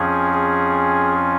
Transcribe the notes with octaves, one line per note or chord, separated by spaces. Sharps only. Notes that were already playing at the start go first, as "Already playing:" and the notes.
Already playing: F2 F3 C#4 G#4
G#4